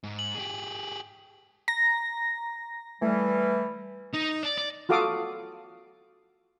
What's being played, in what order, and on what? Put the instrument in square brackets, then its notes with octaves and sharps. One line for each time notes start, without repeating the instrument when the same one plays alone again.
[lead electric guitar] G#2
[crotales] F#7
[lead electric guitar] G4 G#4
[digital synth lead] A#5 [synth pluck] A#6
[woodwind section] E3 G3 [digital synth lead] A3
[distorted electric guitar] D#4
D5
D5
[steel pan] F4 F#4 A4 F5 D6 D#6